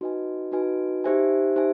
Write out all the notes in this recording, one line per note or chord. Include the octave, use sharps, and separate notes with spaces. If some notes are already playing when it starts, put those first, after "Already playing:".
D#4 F#4 B4 D#5 G#5
D#4 F#4 B4 D#5 G#5
D#4 G4 C5 E5 G#5
D#4 G4 C5 E5 G#5